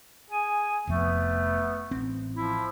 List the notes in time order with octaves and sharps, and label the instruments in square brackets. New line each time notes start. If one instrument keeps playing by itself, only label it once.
[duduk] G#4 [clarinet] G#5
[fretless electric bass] F1 F2 F3 [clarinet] A3 [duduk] B3
[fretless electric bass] A1 C4
[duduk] F3 [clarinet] E4